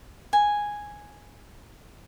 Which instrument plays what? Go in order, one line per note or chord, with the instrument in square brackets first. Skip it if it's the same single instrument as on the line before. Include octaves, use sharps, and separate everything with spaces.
[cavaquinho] G#5